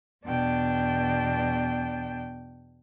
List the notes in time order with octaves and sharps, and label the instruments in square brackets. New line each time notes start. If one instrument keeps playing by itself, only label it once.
[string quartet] E2 B2 D4 G5